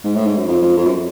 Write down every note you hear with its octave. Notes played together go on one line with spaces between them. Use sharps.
G#2
A2
G#2
F#2
F2
F2
F2
F#2